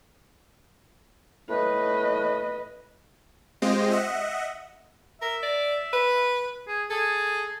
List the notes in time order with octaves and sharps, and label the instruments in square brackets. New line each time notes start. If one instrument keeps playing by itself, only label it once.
[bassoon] A2 [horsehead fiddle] B4 D#5
[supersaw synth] G#3 C4 F4 G4 C5 D#5
D#5 E5 F#5
[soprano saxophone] A#4 [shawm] E5
[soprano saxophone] D5
B4
[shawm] G#4
[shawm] G#4 [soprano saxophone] A4